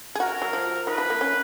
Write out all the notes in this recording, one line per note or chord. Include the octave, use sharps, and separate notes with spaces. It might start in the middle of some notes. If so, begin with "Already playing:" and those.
G#4
F#4 A#4
F#3
F3
D#3 B4
F3
A#3
C#4